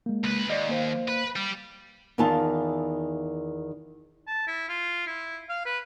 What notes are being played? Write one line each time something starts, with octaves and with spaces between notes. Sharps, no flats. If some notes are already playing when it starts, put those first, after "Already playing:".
G#3 A#3
C#2 B4
D#2 D5 D#5
A#3 C5 F5
B4
G3
E2 D#3 E3 F4 F5 A5
A5
E4
F4
E4
F5
B4